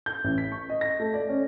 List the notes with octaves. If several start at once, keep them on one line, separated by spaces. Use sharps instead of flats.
G6
A1
B6
C#6
D#5
A#6
A3
D5
C#4